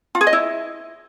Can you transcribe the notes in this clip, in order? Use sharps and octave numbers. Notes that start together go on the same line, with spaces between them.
F4
G#4
D#5
E4